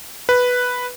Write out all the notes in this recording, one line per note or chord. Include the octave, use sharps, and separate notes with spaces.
B4